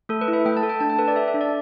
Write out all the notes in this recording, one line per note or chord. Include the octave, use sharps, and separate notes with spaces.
A3 A4
B4
E4
E5
A3 G5
A5
A4
G5
D4 A5
G5
A4 B4
D5
A4 E5
E5
D4
D5